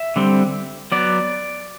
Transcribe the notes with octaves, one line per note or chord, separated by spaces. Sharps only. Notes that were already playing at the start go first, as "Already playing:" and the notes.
Already playing: E5
D3 G3 C4
F#3 B3 D5